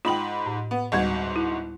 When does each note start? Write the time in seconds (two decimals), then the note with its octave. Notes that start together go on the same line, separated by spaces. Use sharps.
0.05 G#2 F4 G5 B5 F#7
0.46 A2
0.71 B3
0.92 G1 D2 G#2 G3 F#4 G#6
1.36 E4